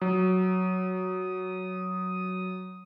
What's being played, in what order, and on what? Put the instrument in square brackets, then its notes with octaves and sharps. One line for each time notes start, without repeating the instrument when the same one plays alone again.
[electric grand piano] F#3 [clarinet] D#6